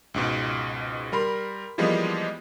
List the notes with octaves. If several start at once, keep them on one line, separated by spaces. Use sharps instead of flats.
C#2 G#2 B2
G3 A#4 B5 C6
E3 F3 G3 G#3 A#3 B3